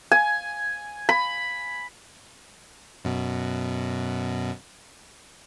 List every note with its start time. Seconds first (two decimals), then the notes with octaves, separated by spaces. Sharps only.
0.12 G#5
1.09 B5
3.05 F#2 B2